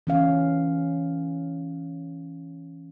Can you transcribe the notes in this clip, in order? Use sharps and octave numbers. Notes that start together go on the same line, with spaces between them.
E3 C#4 F5